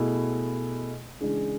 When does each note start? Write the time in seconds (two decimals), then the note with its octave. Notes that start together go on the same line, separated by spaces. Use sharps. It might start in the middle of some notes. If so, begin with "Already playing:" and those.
Already playing: B2 A3 E4 G#4
1.20 C#3 E3 G#3 D4 G#4